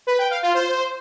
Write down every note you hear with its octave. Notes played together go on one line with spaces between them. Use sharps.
B4
G5
F5
F4
C5